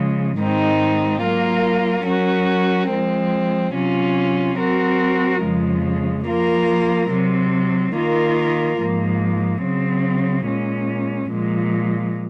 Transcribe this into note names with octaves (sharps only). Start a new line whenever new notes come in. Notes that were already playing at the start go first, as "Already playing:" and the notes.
Already playing: C#3 F3 G#3
G#2 D#3 G#3 C4 D#4
F#3 A#3 F4 A#4
F#3 C#4 F#4 A#4
F3 G#3 C4
C3 F#3 C#4 F4
F#3 C4 F#4 A#4
F2 C#3 F3 G#3
F3 A#3 F4 A#4
C3 F#3 C4
D#3 A#3 F4 A#4
G#2 F3 A#3
C#3 F#3 C4
A#2 G#3 C#4
A#2 F3 G#3